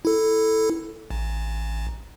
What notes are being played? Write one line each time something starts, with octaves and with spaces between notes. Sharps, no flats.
E4 A4
A1